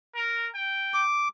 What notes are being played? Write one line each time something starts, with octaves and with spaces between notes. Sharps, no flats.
A#4
G5
D6